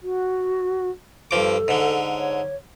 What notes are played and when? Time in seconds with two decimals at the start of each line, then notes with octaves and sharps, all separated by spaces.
0.01 F#4
1.31 G2 F3 A4 D6
1.68 G#2 D3
2.15 C#5